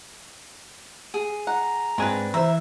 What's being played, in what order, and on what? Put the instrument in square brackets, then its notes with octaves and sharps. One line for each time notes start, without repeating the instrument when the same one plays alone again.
[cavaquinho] G#4
[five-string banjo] F#5 [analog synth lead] A#5
[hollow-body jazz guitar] G#2 G#5 [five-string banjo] C4 D4 B4
[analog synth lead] E3 [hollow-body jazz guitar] C5 A#5 [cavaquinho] E5